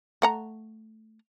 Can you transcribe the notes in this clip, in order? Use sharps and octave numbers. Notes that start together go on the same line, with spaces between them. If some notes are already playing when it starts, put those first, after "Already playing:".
A3 F#5 A#5